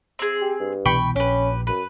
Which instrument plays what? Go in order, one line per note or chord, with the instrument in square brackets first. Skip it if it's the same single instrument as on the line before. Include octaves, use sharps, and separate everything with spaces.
[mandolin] C4 G#4
[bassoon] G4
G2
[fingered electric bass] C2 B2 E3 [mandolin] G5 B5 C#6
[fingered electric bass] A#1 [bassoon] C#4 [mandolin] G4 B4
[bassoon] F#2 [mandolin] B4